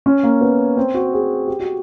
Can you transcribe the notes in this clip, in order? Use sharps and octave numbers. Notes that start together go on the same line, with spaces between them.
C#4
A#3
B3
C4
F#4
G#4
G4
F#4